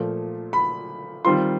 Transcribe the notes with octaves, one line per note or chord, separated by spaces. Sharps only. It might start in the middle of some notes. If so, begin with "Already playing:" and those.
Already playing: A#2 F3 A3
B5
D#3 G3 C4 F4 C6